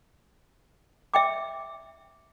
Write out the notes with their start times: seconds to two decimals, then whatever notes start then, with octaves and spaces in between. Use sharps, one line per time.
1.14 E5 G5 D6